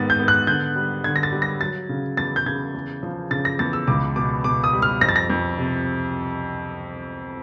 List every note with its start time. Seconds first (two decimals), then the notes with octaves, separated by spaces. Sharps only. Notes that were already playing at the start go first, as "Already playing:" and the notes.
Already playing: G#2 D#3 B3 A6
0.10 G6
0.19 B3
0.28 F#6
0.47 D3 G6
0.76 G3
1.04 D3 G#6
1.16 A#6
1.23 A6
1.33 G3
1.42 A#6
1.61 F#3 A6
1.89 C#3
2.17 E2 A6
2.36 G6
2.46 C#3 G#6
2.74 E2
3.03 F3
3.31 C#3 A6
3.45 A#6
3.59 E2 A6
3.73 E6
3.88 C#2 D6
4.16 B2 D6
4.44 B2 D6
4.64 D#6
4.73 G3
4.82 F6
5.01 F2 A#6
5.09 A6
5.16 A#6
5.30 F2
5.58 C3